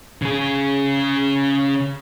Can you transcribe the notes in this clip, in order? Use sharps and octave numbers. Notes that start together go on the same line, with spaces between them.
C#3 G#4